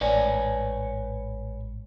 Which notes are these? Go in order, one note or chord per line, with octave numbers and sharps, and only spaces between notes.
A1 G#2 B4 C#5 D5 G#5